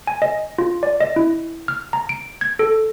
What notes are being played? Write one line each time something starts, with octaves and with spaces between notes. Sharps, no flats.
G#5
D#5
F4
D5
D#5
E4
F6
A#5
D7
G#6
A4